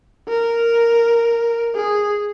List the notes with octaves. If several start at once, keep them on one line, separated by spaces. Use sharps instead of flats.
A#4
G#4